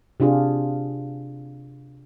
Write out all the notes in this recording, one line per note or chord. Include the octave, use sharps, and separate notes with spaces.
C3 D4 F4 G#4